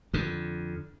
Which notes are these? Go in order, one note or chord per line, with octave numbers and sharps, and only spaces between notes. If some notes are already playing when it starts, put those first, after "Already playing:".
F2 D3